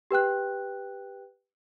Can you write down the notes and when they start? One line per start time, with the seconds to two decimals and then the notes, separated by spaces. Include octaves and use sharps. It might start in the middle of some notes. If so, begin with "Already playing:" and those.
0.11 G4 B4 G5 F#6